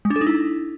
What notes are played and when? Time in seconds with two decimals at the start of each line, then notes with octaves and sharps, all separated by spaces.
0.05 G#3
0.10 D4
0.16 A4
0.21 D#4
0.27 E4